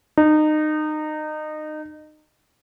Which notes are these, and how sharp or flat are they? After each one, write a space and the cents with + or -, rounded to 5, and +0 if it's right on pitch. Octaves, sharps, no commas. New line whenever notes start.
D#4 -25